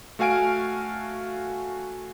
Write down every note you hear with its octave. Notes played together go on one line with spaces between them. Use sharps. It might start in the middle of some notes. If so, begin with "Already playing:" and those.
A3 F#4 F5 G#5 F6 D7